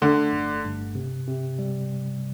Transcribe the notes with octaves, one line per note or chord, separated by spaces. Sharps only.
D3 A3
G1
G2
C3
C3
G3